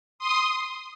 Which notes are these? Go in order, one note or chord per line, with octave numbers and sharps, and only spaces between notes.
C6 D#6